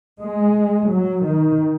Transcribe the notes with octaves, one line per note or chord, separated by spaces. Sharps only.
G#3
F#3
D#3